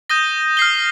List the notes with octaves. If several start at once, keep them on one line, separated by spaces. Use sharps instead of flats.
D#6 G6 A#6 D#7 G7
F6 C7 G7